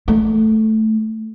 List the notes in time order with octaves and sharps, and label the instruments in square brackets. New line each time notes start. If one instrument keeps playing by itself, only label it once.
[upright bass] A3